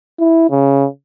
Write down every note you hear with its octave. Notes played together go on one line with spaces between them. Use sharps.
E4
C#3